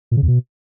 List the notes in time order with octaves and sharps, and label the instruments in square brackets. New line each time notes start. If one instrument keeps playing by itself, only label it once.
[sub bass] A#2
C#3
E2
B2